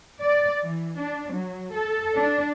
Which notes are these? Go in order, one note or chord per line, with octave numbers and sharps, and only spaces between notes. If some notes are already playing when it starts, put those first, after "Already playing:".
D5
E3
D4
F#3
A4
D4